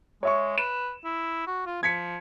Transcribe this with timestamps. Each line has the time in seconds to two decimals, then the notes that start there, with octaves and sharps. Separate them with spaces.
0.23 G#3 C#5 E5 C#6
0.58 B4 E7
1.04 E4
1.47 F#4
1.66 F4
1.83 F3 G#6 B6 C#7